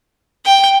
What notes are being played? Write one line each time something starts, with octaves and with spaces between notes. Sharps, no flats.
G5